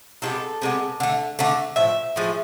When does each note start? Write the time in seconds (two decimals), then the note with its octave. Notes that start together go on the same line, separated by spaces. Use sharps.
0.22 C3 G#3 B3 F4 A4
0.62 C3 G#3 B3
1.00 D3 A3
1.39 D3 A3
1.76 A2 F3 E5
2.16 A2 F3 G#3